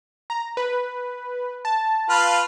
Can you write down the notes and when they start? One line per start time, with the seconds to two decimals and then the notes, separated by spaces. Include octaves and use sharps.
0.30 A#5
0.57 B4
1.65 A5
2.09 F4 B4 F5